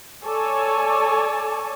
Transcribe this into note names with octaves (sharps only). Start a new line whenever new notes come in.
A4 C#5 D5 G#5 A5